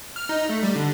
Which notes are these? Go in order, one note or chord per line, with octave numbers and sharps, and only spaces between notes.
F6
D#4
A3
G3
D3